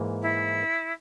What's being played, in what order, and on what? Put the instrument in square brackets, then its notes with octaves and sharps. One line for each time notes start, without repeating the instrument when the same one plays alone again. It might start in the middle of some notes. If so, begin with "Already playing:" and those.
Already playing: [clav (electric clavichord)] G#2 E3 A#3
[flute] E4